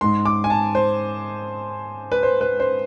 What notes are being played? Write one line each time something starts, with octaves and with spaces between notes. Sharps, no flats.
G#2 G#3 C6
D6
G#5
A5
C5
B4
C5
B4
C5